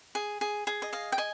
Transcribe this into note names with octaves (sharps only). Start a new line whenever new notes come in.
G#4
G#4
G#4
D#5
D#5 F5
G5
D#5 G#5